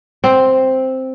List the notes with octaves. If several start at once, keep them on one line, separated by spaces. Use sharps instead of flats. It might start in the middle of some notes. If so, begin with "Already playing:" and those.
C4